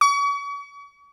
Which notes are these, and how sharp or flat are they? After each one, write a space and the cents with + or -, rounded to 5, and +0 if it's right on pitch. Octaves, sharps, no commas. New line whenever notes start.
C#6 +40